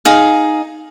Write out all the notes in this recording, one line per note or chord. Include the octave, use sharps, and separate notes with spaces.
D#4 G#4 F5